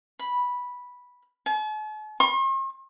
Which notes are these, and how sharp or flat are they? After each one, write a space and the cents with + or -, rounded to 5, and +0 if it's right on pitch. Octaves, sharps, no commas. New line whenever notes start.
B5 -10
A5 -45
C6 +45